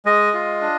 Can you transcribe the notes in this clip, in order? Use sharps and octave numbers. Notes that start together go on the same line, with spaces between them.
G#3 D#5
F4
D4